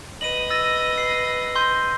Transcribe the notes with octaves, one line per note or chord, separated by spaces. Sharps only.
B4 D#5 D#7 F#7
E6 A6 A#6
C7
C6 G6